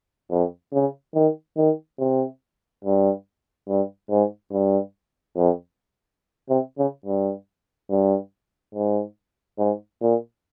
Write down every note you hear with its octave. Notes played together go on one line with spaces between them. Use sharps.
F2
C#3
D#3
D#3
C3
G2
G2
G#2
G2
F2
C3
C#3
G2
G2
G#2
G#2
A#2